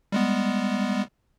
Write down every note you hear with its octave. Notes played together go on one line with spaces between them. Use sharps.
G3 G#3 B3